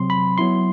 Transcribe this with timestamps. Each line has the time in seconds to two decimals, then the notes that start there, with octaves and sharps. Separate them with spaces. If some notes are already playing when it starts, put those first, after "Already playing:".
Already playing: C3 F#3 C4 C6
0.10 B5
0.38 F#3 B3 E4 C6